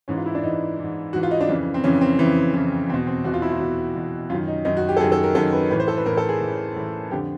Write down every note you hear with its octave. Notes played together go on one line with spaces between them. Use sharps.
G#2 E3 C#4
F4
E4
D4
G#2 E3 D#4
G#2 E3
G#2 E3 F#4
F4
D#4
D4
F2 C#3 E3
C4
F2 C#3 E3 C#4
C4
F2 C#3 E3
F2 C#3 E3
E2 B2 C4
C4
E2 B2 F#4
F4
E4
F4
E2 B2 F#4
E2 B2
F#2 F4
D#3
D#4
F#2 D#3 D#4
F#4
G4
A4
F#2 D#3 G#4
A4
A#4
F#2 D#3 A4
B4
A2 E3 B4
C5
A4
B4
A2 E3 A#4
A4
G#4
A2 E3
A2 E3
F2 D3 G4